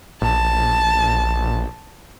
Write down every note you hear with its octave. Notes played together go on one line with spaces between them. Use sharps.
A#1 A5